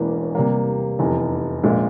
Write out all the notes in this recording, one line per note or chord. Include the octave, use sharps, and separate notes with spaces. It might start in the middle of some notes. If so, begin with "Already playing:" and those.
Already playing: E1 E2 E3 A#3 C#4
C3 G3 A#3
F1 E2 C3
A#1 A#2 G#3